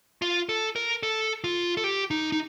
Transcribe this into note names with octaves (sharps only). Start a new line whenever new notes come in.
F4
A4
A#4
A4
F4
A4
G4
D#4
D#4